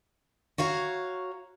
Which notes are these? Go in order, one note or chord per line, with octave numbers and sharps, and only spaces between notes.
F#4 C#5 F5 A#5